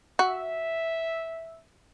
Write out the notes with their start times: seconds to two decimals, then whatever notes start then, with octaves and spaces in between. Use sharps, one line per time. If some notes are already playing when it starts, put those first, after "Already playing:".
0.19 F#4 E5